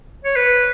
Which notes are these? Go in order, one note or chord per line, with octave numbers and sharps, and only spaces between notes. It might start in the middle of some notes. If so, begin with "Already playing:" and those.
C#5
B4